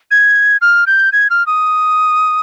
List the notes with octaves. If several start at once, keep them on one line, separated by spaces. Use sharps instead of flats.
G#6
F6
G6
G#6
F6
D#6